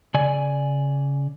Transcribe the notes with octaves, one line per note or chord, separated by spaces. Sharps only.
C#3 D5 G#5